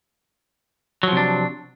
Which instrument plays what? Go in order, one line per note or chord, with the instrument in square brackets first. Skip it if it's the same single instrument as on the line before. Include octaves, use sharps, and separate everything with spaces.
[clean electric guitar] F#3
F3
C3
D4